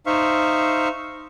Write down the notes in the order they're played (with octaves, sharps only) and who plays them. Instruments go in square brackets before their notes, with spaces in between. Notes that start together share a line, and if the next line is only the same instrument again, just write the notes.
[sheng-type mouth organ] D#4 C5 E5 F5 C#6